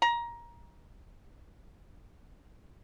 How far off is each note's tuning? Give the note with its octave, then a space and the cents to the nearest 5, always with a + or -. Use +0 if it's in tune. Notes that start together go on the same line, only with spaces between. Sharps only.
A#5 +20